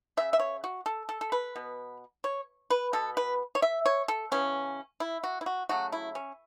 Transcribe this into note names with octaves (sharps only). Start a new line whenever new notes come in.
C#3 A3 E5
E5
C#5
F#4
A4
A4
A4
B4
B2 B3
C#5
B4
B2 B3 A4
B4
C#5
E5
C#5
A4
C#3 E3 B3 C#4
E4
F#4
E4
F#4
C#3 F#3 A3 F#4
E4
C#4